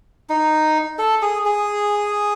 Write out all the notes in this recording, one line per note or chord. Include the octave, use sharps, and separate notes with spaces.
D#4
A4
G#4
G#4